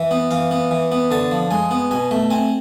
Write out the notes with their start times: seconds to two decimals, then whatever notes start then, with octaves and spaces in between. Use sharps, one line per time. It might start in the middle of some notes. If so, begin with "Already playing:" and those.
Already playing: E3 E5
0.11 B3
0.31 E3 F5
0.51 B3
0.71 E3
0.92 B3
1.11 D3 A5
1.31 F3
1.51 G#3 G#5
1.71 B3
1.91 B2 G#5
2.11 A3 E5
2.30 C4 G#5